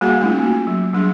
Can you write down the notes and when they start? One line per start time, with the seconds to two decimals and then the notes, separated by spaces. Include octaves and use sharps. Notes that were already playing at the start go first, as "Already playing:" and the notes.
0.01 G3 A#3 F#4 G#4 F5 F#5
0.21 A3 C#4 D#4 F4
0.40 A#3 F#4
0.67 F#3
0.93 F#3 G3 D4 G#4